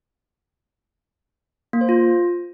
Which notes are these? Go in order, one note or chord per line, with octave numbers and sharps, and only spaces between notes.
A#3
C5
F4